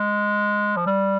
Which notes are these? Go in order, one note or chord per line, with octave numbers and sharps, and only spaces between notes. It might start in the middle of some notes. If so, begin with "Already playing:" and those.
Already playing: G#3
F3
G3